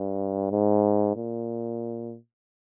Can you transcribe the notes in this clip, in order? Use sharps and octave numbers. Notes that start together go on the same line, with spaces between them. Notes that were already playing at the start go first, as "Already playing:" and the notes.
Already playing: G2
G#2
A#2